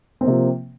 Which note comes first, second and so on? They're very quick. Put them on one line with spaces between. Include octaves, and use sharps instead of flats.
C4 A#3 C3 F3